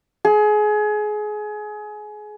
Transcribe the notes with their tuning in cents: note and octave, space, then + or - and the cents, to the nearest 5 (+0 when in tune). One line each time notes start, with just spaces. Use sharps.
G#4 +25